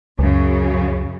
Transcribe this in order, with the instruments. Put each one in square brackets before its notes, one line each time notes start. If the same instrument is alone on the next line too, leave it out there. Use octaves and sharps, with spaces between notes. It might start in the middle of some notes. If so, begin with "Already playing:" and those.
[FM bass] C#2 [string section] F#2 C#3